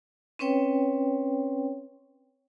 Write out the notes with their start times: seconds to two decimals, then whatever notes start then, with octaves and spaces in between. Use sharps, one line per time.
0.39 C4 C#4 B4 C#5 G5